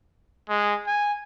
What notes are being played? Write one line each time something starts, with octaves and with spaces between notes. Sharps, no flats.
G#3
G#5